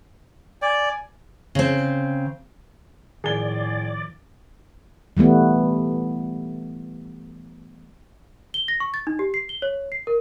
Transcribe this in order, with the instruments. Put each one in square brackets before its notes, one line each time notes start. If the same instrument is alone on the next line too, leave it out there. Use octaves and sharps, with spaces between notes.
[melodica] D5 [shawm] G#5
[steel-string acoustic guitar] C#3 C4
[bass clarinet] A2 [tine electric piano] D#3 F3 [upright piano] G#4 G7 [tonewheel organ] D5
[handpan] E3 G3 A3 B3
[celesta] G7
A#6
C#6
A6
D#4
G4
C7
G7
C#5
C7
A#4